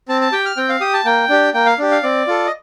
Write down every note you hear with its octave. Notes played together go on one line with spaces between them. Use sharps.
C4 A5
A5
G4 G5
F6
C4 G5
F5
G4 D#6
A5
A#3 G5
D4 G4
A#3 G5
F5
D4 G4
F5
C4 D5
F4 A4
D#5